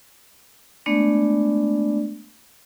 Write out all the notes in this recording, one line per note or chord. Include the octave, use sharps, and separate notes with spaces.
G#3 A3 B3 D4 D5